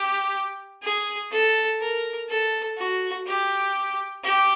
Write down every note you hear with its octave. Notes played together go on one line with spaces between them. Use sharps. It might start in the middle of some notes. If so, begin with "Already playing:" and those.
Already playing: G4
G#4
A4
A#4
A4
F#4
G4
G4